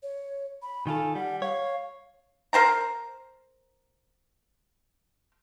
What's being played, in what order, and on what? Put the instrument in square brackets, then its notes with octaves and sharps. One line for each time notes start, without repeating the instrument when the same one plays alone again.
[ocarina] C#5
B5
[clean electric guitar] D#3 F4 A4 [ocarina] G#5
[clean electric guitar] G3 [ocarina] F#5
[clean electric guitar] C#5 [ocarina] F5
[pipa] A#4 C5 G5 A#5